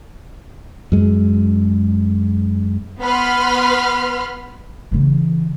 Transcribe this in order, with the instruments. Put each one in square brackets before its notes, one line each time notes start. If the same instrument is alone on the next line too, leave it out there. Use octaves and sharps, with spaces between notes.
[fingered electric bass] F#2 G#3
[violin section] B3 B4 B5 C6 F6
[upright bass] C#3 E3